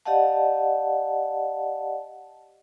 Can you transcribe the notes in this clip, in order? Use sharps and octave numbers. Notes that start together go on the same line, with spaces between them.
G4 D5 D#5 F5 F#5 A5